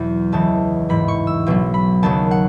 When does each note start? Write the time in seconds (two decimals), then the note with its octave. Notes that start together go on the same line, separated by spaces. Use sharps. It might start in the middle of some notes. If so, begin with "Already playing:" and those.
Already playing: E2 B2 F#3
0.32 C#2 C#3 E3 A5
0.89 A1 G#2 E3 B5
1.08 C#6
1.27 E6
1.46 B1 B2 F#3
1.74 B5
2.03 D#2 C#3 F#3 A5
2.31 F#5